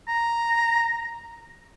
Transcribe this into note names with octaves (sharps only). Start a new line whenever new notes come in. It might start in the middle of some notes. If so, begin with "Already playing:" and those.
A#5